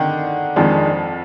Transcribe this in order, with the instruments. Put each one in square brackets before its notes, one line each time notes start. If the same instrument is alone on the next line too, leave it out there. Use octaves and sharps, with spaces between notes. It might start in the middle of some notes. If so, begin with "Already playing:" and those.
Already playing: [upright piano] D3 D#3
[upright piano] F2 F3 [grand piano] D#3 G#3 D4